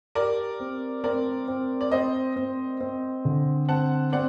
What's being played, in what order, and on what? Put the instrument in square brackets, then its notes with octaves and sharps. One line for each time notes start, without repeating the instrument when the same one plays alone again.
[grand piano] G4 [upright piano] A#4 D5
[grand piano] C4
[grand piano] C4 [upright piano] A#4 D5
[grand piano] C4
[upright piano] D5
[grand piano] C4 [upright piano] C5 D#5
[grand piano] C4
C4
D3
[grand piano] C4 [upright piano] F#5 A5
[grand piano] C4 [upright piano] D5 F#5